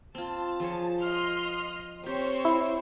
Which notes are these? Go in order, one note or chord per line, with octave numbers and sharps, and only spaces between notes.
C4 F4 A5
F3 G#4 C#5
D#5 C6 F6
C4 G4 A#4 C5 C#5
E4